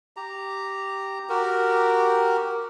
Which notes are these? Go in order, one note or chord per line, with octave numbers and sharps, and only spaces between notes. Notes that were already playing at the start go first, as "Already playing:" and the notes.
G4 A#5
F#4 G4 A#4